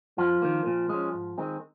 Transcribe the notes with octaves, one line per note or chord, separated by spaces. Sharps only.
F2 F3 F4
D#3 A#3
A#2
G#3 C#4
G#2
D#3 G#3 C4